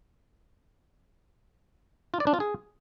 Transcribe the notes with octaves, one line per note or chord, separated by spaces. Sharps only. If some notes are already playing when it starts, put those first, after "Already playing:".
F4
D5
D4
F4
G#4